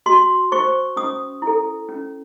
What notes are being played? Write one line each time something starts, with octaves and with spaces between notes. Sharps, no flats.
F#4 C6
C5 C#6
C#4 D#6
E4
A4
C#4